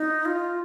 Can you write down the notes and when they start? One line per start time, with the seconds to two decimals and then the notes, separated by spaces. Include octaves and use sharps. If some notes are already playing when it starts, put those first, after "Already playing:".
Already playing: D#4
0.25 F4